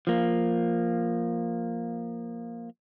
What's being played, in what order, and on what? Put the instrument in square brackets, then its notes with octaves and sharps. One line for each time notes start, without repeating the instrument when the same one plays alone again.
[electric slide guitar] F3 A#3